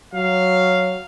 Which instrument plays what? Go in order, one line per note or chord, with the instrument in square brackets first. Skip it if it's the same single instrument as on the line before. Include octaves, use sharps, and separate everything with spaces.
[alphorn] F#3 [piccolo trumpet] F5